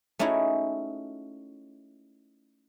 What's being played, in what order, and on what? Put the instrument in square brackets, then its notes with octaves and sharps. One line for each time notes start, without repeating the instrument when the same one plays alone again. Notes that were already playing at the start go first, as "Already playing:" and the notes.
[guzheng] A3 C#4 D#4 E4 F#4 G#4